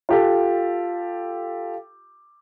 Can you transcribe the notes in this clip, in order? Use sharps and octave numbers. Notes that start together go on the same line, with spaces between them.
F4 G4 A4